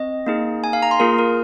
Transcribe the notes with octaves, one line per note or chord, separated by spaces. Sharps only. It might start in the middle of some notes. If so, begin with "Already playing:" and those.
Already playing: C4 D#5
A#3 D#4 G#4
G#5
F5
A#5
C6
A#3 F4 G#4 A#4
A#4